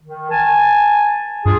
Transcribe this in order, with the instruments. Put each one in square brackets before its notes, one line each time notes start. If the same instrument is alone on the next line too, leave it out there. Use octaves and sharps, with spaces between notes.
[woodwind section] D#3
G#5 A5
[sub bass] G2 [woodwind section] F4 G#4